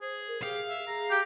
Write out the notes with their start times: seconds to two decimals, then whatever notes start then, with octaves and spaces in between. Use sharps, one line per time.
0.02 G#4 C5
0.28 A#4
0.43 G4 G#4 F5
0.69 E5
0.88 G#4 A#5
1.10 G4